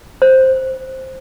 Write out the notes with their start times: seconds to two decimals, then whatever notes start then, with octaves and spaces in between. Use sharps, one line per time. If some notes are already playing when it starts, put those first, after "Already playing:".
0.22 C5